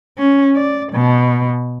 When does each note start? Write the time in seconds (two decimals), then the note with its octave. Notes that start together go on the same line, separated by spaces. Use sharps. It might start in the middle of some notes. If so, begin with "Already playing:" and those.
0.18 C#4
0.55 D5
0.92 B2